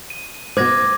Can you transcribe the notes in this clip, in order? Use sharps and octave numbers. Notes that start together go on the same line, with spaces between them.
D#7
G#2 B2 C5 D6 G#6 A#6